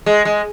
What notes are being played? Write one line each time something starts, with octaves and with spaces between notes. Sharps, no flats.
G#3
G#3